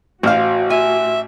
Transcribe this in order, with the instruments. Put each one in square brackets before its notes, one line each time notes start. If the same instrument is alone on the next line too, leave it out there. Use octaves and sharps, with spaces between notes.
[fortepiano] A1 F6 [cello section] A2 F#4 [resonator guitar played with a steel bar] C5 F5
[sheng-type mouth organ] E5 [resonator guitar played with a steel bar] G#5